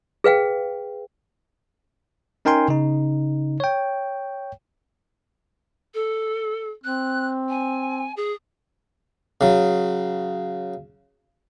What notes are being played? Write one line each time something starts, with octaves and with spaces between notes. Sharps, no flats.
G#4 B4 F5 G5
C#4 D#4 A#4 G5 G#5 C6
C#3 D#4
C#5 G5
A4
C4 F#6
G#5
G#4
C#3 F#3